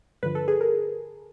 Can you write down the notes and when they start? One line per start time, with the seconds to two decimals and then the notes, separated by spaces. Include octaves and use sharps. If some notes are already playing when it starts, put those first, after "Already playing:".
0.23 G2 D3 F3 B4
0.35 A4
0.48 G#4
0.61 A#4